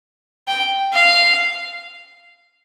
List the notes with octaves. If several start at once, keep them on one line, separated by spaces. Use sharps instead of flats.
G5
F5